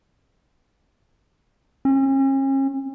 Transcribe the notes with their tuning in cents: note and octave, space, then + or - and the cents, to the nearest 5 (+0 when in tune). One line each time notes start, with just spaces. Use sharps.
C#4 -40